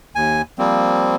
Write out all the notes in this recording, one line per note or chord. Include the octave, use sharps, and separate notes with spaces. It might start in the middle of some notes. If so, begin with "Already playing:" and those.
D#2 G#5
F3 G3 A#3 C4